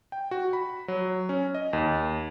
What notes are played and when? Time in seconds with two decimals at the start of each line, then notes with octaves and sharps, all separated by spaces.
0.12 G5
0.31 F#4
0.53 B5
0.88 F#3
1.29 C#4
1.54 D#5
1.73 D#2